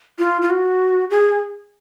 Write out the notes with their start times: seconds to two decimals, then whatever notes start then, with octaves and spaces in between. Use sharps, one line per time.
0.19 F4
0.42 F4
0.50 F#4
1.10 G#4